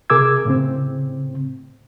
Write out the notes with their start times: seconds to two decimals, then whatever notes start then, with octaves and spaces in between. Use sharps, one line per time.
0.10 C3 G#4 A#4 D6 E6 G#6
0.45 A2 C#3 C4